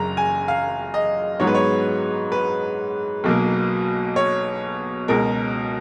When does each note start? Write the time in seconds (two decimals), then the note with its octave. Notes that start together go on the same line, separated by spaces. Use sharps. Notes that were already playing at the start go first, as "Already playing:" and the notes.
Already playing: F#1 F#2 C#3 A#5
0.17 G#5
0.48 F5
0.94 D#5
1.40 G#2 F#3 B3 D#4 C#5
1.47 B4
1.55 C#5
2.32 B4
3.24 B1 B2 F#3 A#3
4.16 C#5
5.08 C#2 B2 G#3 A#4